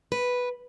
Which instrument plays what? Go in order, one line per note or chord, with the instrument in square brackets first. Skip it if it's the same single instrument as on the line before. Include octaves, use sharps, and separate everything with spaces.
[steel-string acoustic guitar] B4